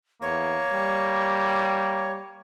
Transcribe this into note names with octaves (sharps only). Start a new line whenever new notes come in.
E2 A#3 C#5
G3